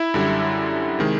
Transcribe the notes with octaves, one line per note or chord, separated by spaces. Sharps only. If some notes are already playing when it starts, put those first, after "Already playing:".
Already playing: E4
F#2 D3 G3
C3 D#3 G#3